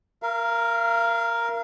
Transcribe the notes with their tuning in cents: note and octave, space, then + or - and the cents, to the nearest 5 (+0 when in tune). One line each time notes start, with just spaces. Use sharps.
A#4 +0 F5 -35